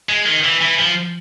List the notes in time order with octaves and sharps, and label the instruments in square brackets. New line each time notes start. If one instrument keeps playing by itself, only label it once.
[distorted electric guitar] G#3
D#3
E3
E3
F3